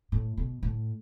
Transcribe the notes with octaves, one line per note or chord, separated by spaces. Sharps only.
A2
B2
A2